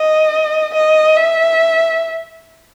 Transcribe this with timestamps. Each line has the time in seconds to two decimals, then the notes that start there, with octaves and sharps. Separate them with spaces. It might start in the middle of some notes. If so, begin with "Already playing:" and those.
Already playing: D#5
0.74 D#5
1.17 E5